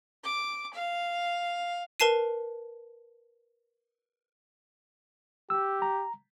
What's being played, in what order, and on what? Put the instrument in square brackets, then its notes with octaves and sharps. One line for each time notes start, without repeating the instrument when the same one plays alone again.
[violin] D6
F5
[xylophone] A#4 B4 A5 C7 D#7
[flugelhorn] G4 [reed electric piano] E6
[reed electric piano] A#5